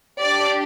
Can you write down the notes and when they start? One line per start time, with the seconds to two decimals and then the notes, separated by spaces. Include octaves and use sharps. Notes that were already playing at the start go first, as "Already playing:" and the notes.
0.21 D4 G4 D5